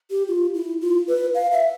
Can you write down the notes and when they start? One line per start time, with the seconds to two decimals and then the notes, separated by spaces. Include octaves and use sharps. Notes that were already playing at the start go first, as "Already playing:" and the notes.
0.11 G4
0.28 F4
0.54 E4
0.81 F4
1.08 B4
1.35 F5
1.52 E5